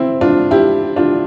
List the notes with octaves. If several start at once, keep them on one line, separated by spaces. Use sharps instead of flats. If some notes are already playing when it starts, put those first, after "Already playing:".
Already playing: C4 E4
D4 F4
E4 G4
D4 F4